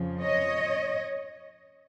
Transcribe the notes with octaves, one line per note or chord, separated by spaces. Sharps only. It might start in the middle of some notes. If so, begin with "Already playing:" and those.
Already playing: F2 C#3 F3
C#5 D#5